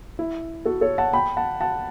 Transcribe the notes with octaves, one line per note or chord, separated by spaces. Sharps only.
E4
F#4 A4
A4 C#5
F#5 A5
G5 B5
F#5 A5
F#5 A5